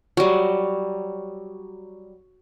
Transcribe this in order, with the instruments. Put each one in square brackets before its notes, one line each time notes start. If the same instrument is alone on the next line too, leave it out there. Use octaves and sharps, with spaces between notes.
[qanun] F#3 G3